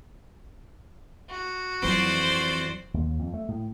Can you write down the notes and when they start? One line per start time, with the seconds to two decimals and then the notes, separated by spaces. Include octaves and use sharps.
1.30 F#4
1.82 F2 E3 F#3 C4 C5 D5
2.94 D#2
3.19 F2
3.34 A3
3.48 A2